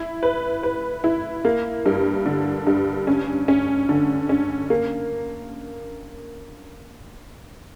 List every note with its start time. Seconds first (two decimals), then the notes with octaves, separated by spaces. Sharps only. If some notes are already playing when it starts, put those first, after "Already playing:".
Already playing: E4
0.23 B4
0.63 B4
1.04 E4
1.45 A#3
1.86 G2
2.26 D3
2.67 G2
3.07 C#4
3.48 C#4
3.89 D3
4.29 C#4
4.70 A#3